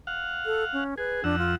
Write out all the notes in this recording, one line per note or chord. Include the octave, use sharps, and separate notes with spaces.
F5 F#5
A4
C#4
G#4 B4
F2 D4 F#5 E6
F4